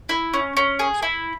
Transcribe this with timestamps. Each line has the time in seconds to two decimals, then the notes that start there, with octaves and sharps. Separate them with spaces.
0.09 E4
0.34 C#4
0.57 C#4
0.79 G#4
1.02 E4